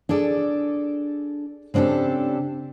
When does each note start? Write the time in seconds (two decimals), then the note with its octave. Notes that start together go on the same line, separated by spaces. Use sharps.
0.09 D4 G#4 A4 D5
1.74 C#3 C4 D4 G4 A4